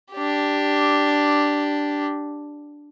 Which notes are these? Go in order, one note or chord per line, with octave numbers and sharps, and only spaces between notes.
D4 G4